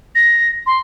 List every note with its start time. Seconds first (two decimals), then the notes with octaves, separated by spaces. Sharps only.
0.15 A#6
0.66 C6